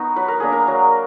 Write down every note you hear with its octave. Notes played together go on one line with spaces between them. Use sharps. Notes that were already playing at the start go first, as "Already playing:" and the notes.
Already playing: B3 D#4 F#4
F#3 B4
A#4
A#3 D4 G#4
A#4
F#3